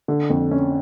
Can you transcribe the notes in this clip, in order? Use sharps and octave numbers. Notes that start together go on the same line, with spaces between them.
D3
F2
C#4